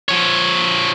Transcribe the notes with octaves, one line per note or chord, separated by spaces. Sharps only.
F3 C#5